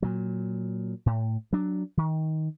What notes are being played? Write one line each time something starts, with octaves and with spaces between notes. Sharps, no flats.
A#2 F#3
A2
F#3 D4
D#3